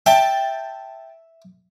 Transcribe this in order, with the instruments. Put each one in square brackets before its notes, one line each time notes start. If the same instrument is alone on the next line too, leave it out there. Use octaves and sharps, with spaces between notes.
[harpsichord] E5 [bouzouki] G5 A5